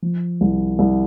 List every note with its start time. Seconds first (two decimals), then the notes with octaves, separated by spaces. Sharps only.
0.02 F3
0.41 C2
0.79 C2